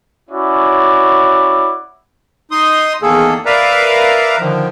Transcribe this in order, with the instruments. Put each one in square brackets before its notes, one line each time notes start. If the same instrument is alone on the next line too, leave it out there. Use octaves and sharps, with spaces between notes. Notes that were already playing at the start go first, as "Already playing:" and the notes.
[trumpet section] C#4 E4 F#4 D5
[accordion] D#4 C6 D#6
E2 D#3 A#3 G#4 A4
A#4 B4 D5 E5 F5 A#5
D3 D#3 F3